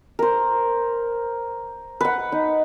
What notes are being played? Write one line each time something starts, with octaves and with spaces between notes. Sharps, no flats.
A#4 C5
B4 F#5
D#4